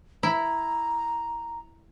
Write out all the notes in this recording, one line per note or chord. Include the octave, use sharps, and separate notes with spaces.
E4 A#5